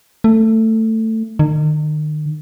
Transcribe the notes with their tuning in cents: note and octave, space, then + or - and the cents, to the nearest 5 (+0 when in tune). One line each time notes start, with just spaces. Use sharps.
A3 +15
D#3 -40